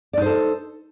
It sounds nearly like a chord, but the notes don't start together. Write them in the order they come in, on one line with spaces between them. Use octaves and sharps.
D5 D#4 C5 A4